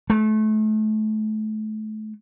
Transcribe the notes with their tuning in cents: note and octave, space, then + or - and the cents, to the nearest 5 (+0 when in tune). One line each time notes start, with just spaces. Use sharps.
A3 -30